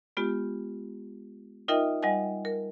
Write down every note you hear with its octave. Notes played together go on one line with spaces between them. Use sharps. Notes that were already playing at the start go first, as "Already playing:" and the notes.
G#3 B3 F4 G4
D#4 F4 A#4 D#5 E5 G5
G3 D#5 F#5 G#5
A#4